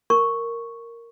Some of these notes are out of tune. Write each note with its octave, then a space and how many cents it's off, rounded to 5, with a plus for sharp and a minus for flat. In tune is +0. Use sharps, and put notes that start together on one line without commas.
A#4 -10 C#6 +0